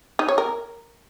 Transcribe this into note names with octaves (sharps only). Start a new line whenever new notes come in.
D#4
C#5
A#4